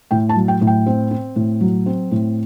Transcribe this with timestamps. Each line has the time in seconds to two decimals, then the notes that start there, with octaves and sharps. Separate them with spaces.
0.11 A2 G5
0.29 A5
0.36 F#3
0.48 G5
0.61 A2
0.67 G5
0.86 C4
1.11 C4
1.36 A2
1.61 F#3
1.86 C4
2.11 A2